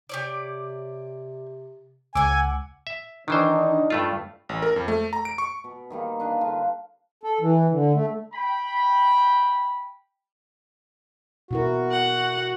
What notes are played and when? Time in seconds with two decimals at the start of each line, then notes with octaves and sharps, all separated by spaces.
0.09 C3 G4 C#5 D5
2.15 C#2 F#5 G#5 D6 E6
2.87 E5
3.28 D#3 E3 D4 D#4 C5
3.90 G2 A3 F4
4.49 A1
4.62 A#4
4.76 F2
4.88 A3
5.13 A#5
5.25 D7
5.38 C#6
5.64 B2
5.90 D#3 G3 A#3
6.20 D4 B4 F5
6.41 D3 F4
7.23 A4
7.41 E3
7.70 D3
7.94 A3
8.34 G5 B5
11.51 B2 E4 F#4 A#4
11.91 F#5